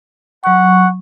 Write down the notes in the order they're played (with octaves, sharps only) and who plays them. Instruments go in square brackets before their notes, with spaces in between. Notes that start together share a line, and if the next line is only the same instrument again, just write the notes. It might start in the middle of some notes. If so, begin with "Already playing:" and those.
[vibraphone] F#3 C#6 [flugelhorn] F#5